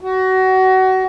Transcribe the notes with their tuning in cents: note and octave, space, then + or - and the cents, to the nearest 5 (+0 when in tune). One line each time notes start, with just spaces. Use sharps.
F#4 +25